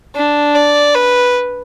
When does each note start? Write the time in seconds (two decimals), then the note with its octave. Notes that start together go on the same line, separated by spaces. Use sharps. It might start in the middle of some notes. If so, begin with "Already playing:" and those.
0.15 D4
0.55 D5
0.95 B4